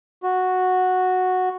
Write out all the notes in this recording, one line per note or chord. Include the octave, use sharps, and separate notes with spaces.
F#4